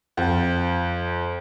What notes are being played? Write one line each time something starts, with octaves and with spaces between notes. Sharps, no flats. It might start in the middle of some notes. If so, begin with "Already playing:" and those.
F2